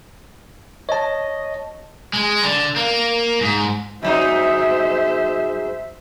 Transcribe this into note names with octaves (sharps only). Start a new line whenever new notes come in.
C#5 D#5 A5
G#3
D3
A#3
G#2
G#2 F#3 D#4 C5 E5